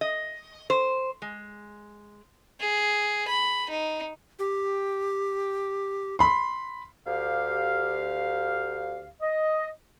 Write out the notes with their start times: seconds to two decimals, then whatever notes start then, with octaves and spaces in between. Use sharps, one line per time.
0.01 D#5
0.70 C5
1.22 G#3
2.61 G#4
3.28 B5
3.70 D#4
4.39 G4
6.19 B5 C6
7.07 D2 G4 F5
9.21 D#5